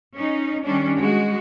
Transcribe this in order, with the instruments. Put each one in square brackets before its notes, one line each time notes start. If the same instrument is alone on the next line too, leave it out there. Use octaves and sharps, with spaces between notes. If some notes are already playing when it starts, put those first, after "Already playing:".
[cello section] C#4 D#4
D#3 G3 C#4 D4
G#3 F#4